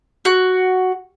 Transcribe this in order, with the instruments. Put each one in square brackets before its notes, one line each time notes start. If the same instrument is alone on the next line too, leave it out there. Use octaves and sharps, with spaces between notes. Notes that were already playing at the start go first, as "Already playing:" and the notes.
[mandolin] F#4